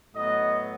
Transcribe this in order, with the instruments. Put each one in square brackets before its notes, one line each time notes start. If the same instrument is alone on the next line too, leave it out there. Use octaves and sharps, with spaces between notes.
[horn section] A2 F#3 B3 D#5